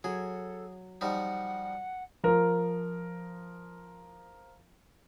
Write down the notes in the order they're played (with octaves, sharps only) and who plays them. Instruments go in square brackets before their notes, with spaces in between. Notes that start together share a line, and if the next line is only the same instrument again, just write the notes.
[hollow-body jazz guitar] F#3 [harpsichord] G#4 [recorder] A4
[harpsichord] F3 G3 D#4 [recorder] F#5
[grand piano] F3 A#4